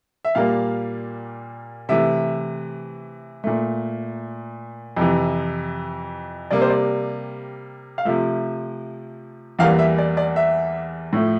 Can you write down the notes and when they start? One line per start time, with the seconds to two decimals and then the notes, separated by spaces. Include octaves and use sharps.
0.25 E5
0.35 A#2 G3 A#3 F5
1.89 C3 E3 A3 E5
3.44 A#2 A3
4.97 F2 C3 E3
6.51 C3 G3 A#3 D5
6.61 C5
6.70 D5
7.98 F5
8.05 C3 F3 A3 E5
9.59 E2 E3 G3 A#3 F5
9.79 E5
9.98 D5
10.17 D5
10.36 E5
11.13 A2 F3 A3